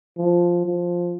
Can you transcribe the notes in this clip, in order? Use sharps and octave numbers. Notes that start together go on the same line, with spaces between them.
F3
F3